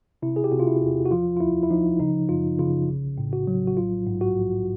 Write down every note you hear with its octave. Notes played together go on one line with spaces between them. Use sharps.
C3 E4
G#4
G4
C3 F#4
F4
E4
E2
F#4
F3 F4
F4
D2 E4
E4
F3 D#4
C#3 D#4
F#2 F4
C#3 F4
A#1
A2
F#4
F#3
F#4
A#1 F4
G#2
F#4
A#1